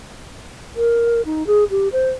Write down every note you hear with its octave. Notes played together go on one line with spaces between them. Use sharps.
A#4
D#4
G#4
G4
C5